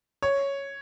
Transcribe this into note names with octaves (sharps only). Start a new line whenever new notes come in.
C#5